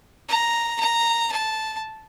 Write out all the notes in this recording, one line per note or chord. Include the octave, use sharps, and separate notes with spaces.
A#5
A#5
A5